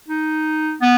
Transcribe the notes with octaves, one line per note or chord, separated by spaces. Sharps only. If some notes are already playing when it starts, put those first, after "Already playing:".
D#4
B3